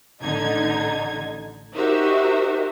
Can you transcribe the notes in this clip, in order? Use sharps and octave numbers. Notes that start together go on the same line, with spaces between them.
A1 D3 D#4 G#6
D#4 F#4 G4 A#4 C5 E5